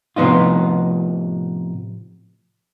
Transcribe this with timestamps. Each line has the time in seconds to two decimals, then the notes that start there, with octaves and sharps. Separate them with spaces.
0.16 A2 C3 F3 B3 D#4 F4